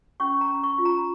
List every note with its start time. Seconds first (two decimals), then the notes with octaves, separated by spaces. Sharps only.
0.20 C#4 C#6
0.41 A#5
0.49 C#4
0.63 C#6
0.78 F4
0.85 A#5